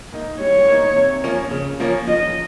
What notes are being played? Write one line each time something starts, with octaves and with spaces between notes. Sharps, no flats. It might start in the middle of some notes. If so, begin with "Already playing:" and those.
A#3 D#4
G3 C#5
A#3 D#4
C3
F3 A#3 C#4
C#3
F3 A#3 C#4
F3 D#5